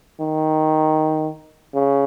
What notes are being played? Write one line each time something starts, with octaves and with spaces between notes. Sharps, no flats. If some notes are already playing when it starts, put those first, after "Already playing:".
D#3
C#3